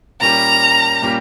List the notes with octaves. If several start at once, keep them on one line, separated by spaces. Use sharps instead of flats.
A#2 G3 A#3 C#4 G4 A#5
A#2 G3 A#3 C#4 G4